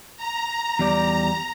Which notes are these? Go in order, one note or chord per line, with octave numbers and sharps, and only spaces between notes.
A#5
E2 G3 D5